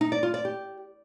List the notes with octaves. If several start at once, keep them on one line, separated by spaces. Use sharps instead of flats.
D#4
D5
F4
D5
G4